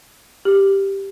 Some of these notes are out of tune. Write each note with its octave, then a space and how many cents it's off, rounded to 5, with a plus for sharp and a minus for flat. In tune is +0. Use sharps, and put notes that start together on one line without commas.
G4 +0